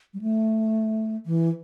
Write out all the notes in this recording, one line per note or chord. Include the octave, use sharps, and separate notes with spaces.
G3
A3
E3